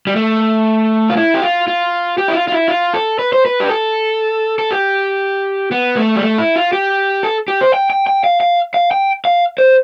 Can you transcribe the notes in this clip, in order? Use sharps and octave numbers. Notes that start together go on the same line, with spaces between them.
G3
A3
F4
E4
G4
F4
F4
G4
E4
F4
F4
E4
F4
A4
B4
C5
B4
G4
A4
A4
G4
B3
A3
G3
A3
E4
F4
G4
A4
G4
C5
G5
G5
G5
F5
F5
F5
G5
F5
C5